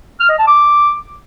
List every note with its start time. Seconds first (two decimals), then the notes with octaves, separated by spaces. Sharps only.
0.20 F6
0.29 D#5
0.38 A5
0.48 D6